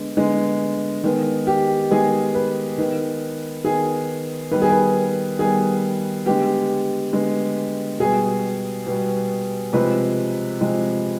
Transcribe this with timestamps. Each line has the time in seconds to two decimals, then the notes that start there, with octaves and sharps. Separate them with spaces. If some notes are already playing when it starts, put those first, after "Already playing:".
Already playing: D3 G#3 B3
0.17 D3 G#3 B3
1.04 D#3 G#3 B3
1.47 G4
1.91 D#3 G#3 B3 G#4
2.34 B4
2.78 D#3 B3
3.64 D#3 B3 G#4
4.51 D#3 G3 B3 B4
4.62 G#4
4.71 B4
5.39 D#3 G3 B3 G#4
6.26 D3 G#3 B3 G4
7.13 D3 G#3 B3
7.99 B2 G3 B3 G#4
8.87 B2 G3 B3
9.73 C3 F3 G#3 B4
10.61 C3 F3 G#3